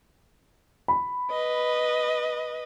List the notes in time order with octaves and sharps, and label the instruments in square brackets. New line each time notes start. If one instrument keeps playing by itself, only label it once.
[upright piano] B5
[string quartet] B4 D#5